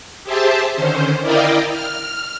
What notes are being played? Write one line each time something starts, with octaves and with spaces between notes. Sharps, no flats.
G4 G#4 C5 E5 A5
D3 D#3 C#4 C5
E4 A#4 D5 D#5 F5 G5
F6